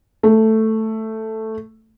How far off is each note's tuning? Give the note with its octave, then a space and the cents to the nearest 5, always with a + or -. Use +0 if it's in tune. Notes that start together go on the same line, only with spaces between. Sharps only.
A3 +5